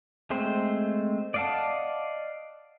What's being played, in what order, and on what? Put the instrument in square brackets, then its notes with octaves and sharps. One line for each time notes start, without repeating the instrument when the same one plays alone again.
[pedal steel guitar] G#3 A3 C4 C5
D5 D#5 F5 F#5 A5